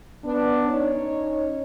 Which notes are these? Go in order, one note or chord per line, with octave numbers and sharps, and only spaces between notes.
B3 D4
C#4 D#4 C#5